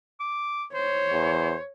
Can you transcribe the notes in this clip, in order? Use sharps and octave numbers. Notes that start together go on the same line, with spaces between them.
D6
C5 C#5
E2